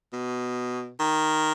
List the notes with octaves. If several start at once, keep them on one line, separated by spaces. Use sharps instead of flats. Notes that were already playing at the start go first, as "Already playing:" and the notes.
B2
D#3